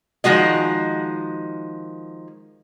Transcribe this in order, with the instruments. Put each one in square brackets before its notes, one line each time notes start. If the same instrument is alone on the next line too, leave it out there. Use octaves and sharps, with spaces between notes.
[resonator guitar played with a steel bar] D#3 F3 G#3 F#4 D#5